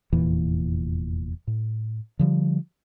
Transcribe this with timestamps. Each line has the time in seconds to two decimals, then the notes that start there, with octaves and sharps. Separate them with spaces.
0.13 F1 E2 A#2 E3
1.47 A2
2.19 D3 F3 G3